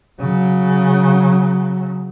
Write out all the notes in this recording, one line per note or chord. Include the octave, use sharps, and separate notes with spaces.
C#3 F#3